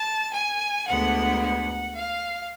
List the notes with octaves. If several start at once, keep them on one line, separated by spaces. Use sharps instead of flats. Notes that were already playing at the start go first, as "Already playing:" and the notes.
Already playing: A5
G#5
D2 D3 G#3 B3 F#5
F#5
F5